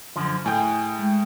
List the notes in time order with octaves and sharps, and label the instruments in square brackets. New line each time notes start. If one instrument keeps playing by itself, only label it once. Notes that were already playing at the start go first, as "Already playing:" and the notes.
[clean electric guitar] F#2 D3 F3
[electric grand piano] A2 G5 G6 [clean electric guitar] G#4
[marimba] G#3